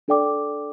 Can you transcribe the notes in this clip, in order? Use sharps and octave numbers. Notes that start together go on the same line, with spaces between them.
D4 A4 D5 G5 D6